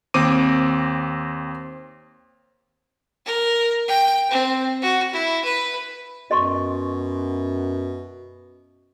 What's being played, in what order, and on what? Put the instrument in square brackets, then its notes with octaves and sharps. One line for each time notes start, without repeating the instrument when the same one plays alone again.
[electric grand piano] D#2 C4 D6 D#7
[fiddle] A#4
G5
C4
F#4
E4
B4
[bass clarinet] F#2 [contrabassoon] B2 [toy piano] D#5 C6 C#6